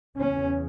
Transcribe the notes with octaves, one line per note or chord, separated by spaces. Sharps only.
E2 C#3 C#4